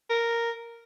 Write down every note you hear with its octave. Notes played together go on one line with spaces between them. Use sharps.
A#4